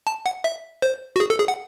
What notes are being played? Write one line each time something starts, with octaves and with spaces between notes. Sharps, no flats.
A5
F#5
E5
C5
F#4
G#4
A4
G#4
F#5